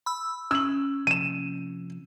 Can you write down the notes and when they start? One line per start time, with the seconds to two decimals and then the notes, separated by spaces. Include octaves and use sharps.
0.06 B5 E6
0.51 C#4 E6 F#7
1.07 C3 F3 A#3 D#7 E7